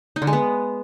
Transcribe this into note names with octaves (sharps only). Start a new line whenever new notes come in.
D#4
D3
G#3
B3